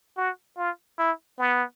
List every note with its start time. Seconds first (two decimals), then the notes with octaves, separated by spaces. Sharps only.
0.17 F#4
0.58 F4
0.99 E4
1.39 B3